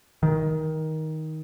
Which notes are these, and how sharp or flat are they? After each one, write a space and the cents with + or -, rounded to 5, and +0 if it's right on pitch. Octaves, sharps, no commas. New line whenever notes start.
D#3 +15